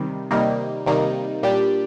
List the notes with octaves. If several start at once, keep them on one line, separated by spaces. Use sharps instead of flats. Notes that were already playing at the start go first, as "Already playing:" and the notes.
Already playing: C3 D#3 G3
C3 D#3 G3 A#3 D#4
C3 D#3 G3 A#3 D#4
A#2 G3 D4 G4